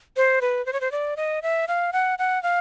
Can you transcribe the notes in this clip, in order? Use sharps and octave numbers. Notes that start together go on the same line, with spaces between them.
C5
B4
C5
C#5
C5
D5
D#5
E5
F5
F#5
F#5
F5